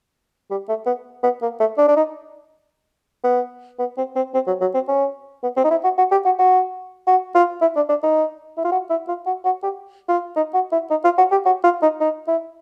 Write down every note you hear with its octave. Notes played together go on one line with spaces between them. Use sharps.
G3
A3
B3
B3
A#3
A3
D4
D4
D#4
B3
B3
C4
C4
C4
F#3
F#3
C4
C#4
B3
C4
D#4
E4
F#4
F#4
G4
F#4
F#4
F#4
F4
E4
D4
D4
D#4
E4
F4
F#4
E4
F4
F#4
F#4
G4
F4
D#4
F#4
E4
D#4
F4
F#4
G4
F#4
F4
D#4
D#4
E4